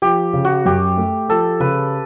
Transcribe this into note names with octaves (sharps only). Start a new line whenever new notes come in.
F3 G4
C#3
F#4
F#2 G4
A3
F3 A4
C#3 B4